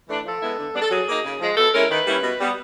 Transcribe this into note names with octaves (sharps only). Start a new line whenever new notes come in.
E3 A3 D4
F3 A4
G#3 B3 E4
D3
G3 B3 D4
A4
F#3 G#4
A#3 D#4
C#3
F3 G#3
B2 A4
G#3 C#4 E4 A#4
D#3 B4
G3 A#3 C#4 E4
B2
G3 B3